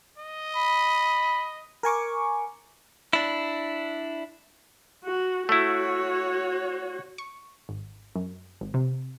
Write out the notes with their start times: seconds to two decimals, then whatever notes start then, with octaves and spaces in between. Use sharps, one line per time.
0.18 D#5
0.56 B5
1.83 A#4 G#5 C#6 D6
3.13 D4 E4
5.04 F#4
5.49 A3 E4 F#4 C#5
7.18 C#6
7.69 G#1
8.16 F#2
8.61 G#1
8.74 C3